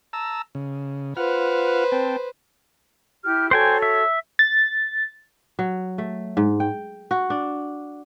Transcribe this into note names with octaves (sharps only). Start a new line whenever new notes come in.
A5 A#5 E6
C#3
F4 B4 C5 F#5 F6
C4 G5 A5
E4 G4 F6
F#4 A4 C5 C#5 G5 G#5
E5
A6
F#3
A3
G#2
G5
F#4
D4